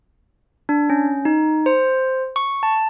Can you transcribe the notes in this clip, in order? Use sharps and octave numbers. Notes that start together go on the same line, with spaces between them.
D4
C#4
D#4
C5
C#6
A5